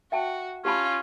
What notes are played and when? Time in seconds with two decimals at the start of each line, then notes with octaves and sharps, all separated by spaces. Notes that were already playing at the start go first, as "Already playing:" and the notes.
0.12 F#4 E5 G5 A5
0.65 C#4 F4 G4 A5 B5